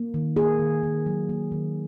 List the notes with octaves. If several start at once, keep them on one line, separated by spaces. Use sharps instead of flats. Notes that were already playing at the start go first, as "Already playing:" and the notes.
Already playing: A#3
D#3
A#3 G#4
D#3
D#3
F#3
A#3
D#3